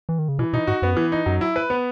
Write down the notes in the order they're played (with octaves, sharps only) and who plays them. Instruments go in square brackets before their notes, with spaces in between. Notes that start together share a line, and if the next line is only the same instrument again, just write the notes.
[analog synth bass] E3
D#3
C#3
[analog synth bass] B2 [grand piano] E3
[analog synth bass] B2 [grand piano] D#4
[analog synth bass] G#2 [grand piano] F#4
[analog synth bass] F#2 [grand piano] B3
[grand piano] E3
D#4
[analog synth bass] F#2 [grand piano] F#3
[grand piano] E4
B4
B3